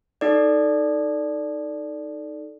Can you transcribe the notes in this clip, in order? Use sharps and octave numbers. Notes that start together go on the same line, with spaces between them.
D#4 A4 D5